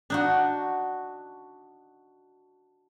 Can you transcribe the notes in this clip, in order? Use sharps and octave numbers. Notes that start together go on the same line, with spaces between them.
D4 D#4 F#4